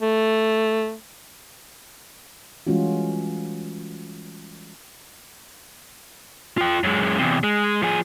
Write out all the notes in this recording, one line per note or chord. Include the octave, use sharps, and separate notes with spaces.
A3
E3 G3 G#3 C#4 F4 F#4
F4 G5
F#2 G#3
E2 C3
G#3
F3 G#4